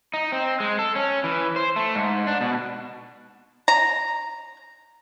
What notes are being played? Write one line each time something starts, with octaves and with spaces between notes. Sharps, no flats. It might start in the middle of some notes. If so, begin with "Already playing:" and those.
D#4
C4
G#3
A4
C#4
E3
C5
A3
G#2
D4
B2
A#5